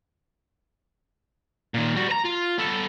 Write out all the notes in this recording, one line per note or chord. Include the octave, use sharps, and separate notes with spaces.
A#2 D#3
G3 F#4
B4 A#5
F4
B3 A4